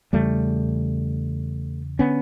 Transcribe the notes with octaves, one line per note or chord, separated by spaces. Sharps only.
E2 C#3 G3 A3
D3 B3 C#4